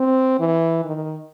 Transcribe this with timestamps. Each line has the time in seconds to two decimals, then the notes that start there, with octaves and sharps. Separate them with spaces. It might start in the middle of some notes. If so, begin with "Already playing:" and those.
Already playing: C4
0.39 E3
0.85 D#3